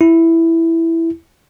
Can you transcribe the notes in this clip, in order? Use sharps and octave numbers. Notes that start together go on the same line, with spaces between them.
E4